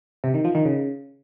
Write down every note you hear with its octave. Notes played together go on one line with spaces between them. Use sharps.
C3
D#3
F3
D#3
C#3